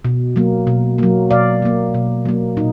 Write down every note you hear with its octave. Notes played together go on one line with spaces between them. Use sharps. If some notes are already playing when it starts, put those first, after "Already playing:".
B2
F#3 A#3
B2
F#3 A#3
B2 D5 F5
F#3 A#3
B2
F#3 A#3
A#2 D#4